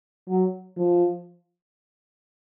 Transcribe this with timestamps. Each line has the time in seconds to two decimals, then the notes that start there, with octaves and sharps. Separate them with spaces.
0.29 F#3
0.77 F3